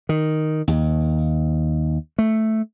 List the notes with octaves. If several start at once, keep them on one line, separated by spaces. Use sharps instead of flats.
D#3
D#2
A3